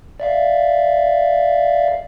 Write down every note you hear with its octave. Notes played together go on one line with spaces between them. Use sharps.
D5 E5 F5